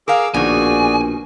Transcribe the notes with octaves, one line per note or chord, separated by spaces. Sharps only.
G#4 A#4 F5 D6 E6
A#1 B2 D#3 F#4 G#4 D5 G#5